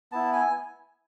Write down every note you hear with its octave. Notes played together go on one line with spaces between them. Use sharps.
B3 E4 A5
G#5